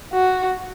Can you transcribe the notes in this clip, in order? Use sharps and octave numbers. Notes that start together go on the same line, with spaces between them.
F#4